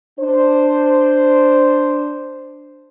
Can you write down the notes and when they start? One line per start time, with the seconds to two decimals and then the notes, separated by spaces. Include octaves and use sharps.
0.19 D4 C5